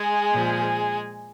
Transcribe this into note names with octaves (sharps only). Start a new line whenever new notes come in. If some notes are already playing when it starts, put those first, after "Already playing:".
Already playing: G#3 G#4
A#2 F3